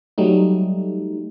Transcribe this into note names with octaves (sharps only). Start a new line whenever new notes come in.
F#3 G3 A3 D#4